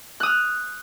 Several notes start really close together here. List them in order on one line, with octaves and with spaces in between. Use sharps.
F#6 D#6 F6